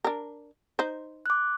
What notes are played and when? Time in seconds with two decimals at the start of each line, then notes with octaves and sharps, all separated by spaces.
0.04 D4 A#4
0.79 D#4 C5
1.26 D6 F#6